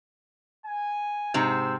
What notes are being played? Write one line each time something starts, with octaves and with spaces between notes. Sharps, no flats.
G#5
G#2 C3 C4 E6